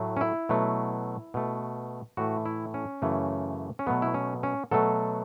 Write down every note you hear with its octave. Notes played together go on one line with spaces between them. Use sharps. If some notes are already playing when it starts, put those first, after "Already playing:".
Already playing: A2 F#3 A3
C#4
E4
B2 F#3 A3
B2 A3
A2 E3 A3 F#4
E4
C#4
F#2 C#3 E3 A3
C#4
B2 F#3 A3 B3
E4
C#4
C#4
B2 F#3 A3 A4